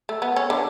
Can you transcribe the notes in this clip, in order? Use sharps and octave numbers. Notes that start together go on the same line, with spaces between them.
A3
B3
C#4
D3 D4